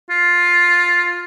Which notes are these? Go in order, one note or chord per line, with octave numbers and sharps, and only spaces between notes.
F4